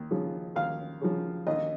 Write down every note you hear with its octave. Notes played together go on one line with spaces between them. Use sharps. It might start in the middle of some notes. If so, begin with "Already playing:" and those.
Already playing: D#2
C#3 F3
D#2 F5
C#3 F3
D#2 D#5